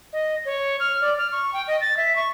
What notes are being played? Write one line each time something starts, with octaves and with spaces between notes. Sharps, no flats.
D#5
C#5
F6
D5
F6
C#6
G5
D#5
A6
E5
C#6